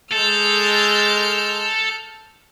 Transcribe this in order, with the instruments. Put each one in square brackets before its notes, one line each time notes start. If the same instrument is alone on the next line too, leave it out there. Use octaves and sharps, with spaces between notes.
[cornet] G#3 [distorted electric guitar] A4 [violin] F6 G6